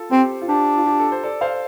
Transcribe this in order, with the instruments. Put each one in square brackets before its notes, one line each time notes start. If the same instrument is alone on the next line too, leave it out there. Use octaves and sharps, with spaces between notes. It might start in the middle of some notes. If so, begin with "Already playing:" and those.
Already playing: [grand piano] F4 A4
[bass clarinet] C4 [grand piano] G4 C5
[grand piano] F4
[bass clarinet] D4 [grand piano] G4
[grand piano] F4
G4
A4
C5
A4 D5
C5 F5